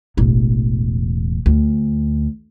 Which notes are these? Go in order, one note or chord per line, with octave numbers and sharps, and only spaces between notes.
E1 A1
D2